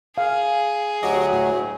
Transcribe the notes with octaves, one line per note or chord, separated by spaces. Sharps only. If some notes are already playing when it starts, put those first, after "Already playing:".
G#4 F5
D2 F#3 F#4 G4 D#5
A2